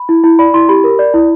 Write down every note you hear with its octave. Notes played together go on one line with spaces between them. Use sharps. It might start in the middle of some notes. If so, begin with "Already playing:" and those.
Already playing: B5
E4
E4
D5 B5
E4 C6
G4 B5
A#4
D5
E4